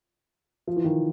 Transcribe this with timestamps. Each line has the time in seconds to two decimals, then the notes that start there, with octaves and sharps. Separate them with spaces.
0.67 F3
0.76 E3
0.84 D#3 F3